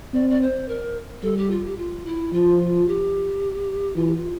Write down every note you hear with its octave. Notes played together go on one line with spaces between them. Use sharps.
C4 D5
D5
C5
A#4
G3 A4
G4
F4
G4
F4
E4
F3 F4
G4
E3 F4
G4
F4